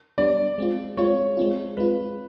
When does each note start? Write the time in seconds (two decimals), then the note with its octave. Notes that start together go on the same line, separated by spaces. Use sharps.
0.18 G3 B3 D4 D5
0.58 G#3 C4 F4
0.97 G#3 C4 F4 C#5
1.37 G#3 C4 F4
1.77 G#3 C4 F4 B4